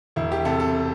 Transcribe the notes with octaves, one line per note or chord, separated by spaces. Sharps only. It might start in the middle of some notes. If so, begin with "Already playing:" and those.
E1 E4
G4
C3 A4
A4